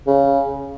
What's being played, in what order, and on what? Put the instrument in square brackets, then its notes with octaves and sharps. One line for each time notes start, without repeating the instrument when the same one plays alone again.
[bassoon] C#3